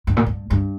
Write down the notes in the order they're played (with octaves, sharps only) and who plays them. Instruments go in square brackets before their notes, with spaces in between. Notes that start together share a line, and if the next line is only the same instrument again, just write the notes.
[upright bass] G2
A#2
G2
G2